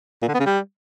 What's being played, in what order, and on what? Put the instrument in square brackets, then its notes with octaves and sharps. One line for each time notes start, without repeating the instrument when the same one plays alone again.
[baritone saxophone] A#2
D3
B3
C#3
G3